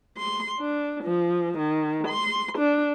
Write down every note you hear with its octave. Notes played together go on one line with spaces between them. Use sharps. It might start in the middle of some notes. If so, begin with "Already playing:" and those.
C6
D4
F3
D#3
C6
D4